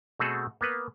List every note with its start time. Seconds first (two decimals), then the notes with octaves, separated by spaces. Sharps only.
0.19 B2 A3 C4 F#4 G#4 A4
0.61 A#3 B3 B4